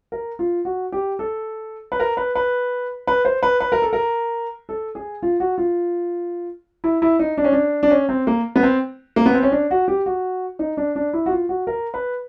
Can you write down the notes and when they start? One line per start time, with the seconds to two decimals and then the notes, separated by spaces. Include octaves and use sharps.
0.12 A#4
0.39 F4
0.65 F#4
0.92 G4
1.19 A4
1.92 B4
2.00 A#4
2.17 B4
2.35 B4
3.07 B4
3.25 C5
3.43 B4
3.60 B4
3.72 A#4
3.82 A4
3.93 A#4
4.69 A4
4.95 G#4
5.23 F4
5.40 F#4
5.58 F4
6.84 E4
7.02 E4
7.19 D#4
7.38 D4
7.44 C#4
7.52 D4
7.83 D4
7.91 C#4
8.09 C4
8.27 A#3
8.56 B3
8.63 C4
9.16 A#3
9.26 B3
9.34 C4
9.43 C#4
9.52 D4
9.71 F#4
9.88 G4
10.06 F#4
10.59 D#4
10.77 D4
10.96 D4
11.13 E4
11.26 F#4
11.31 F4
11.49 F#4
11.67 A#4
11.94 B4